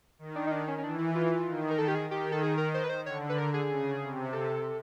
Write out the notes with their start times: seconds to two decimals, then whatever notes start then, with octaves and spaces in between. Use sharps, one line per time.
0.19 D#3
0.35 D4
0.47 D#4
0.51 D4
0.68 C#4
0.78 C#4
0.83 E3 D4
0.99 E4
1.15 F4
1.47 D#3
1.70 A#4
1.78 A4
1.88 G4
1.95 G#4
2.11 D#3 G4
2.32 A4
2.43 G#4
2.58 A#4
2.74 C5
2.84 B4
2.89 C5
3.06 D3 C#5
3.29 B4
3.38 A#4
3.54 G#4
3.69 C#3
4.02 C3
4.33 A4